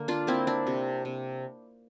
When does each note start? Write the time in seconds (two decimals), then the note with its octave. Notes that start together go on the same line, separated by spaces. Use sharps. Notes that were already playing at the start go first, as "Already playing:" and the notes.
Already playing: D3 A#3
0.08 D4 F4
0.27 A#3 C4 E4
0.47 D4
0.67 C3
1.05 C3